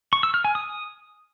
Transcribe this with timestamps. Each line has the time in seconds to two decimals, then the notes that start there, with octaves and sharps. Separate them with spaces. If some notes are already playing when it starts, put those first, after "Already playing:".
0.13 C#6
0.23 E6
0.34 F6
0.45 G#5
0.55 D#6